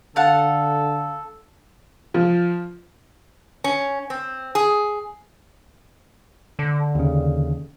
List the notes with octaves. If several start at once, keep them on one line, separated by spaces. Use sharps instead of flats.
D3 A4 F5 F#5 A5
F3
C#4
C4
G#4
D3
D#2 C#3